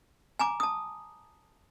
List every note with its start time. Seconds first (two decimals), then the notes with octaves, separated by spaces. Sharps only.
0.39 G#5 A#5 D6
0.60 A5 D#6